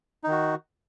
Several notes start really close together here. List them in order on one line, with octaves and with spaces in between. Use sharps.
D#4 D#3 F#4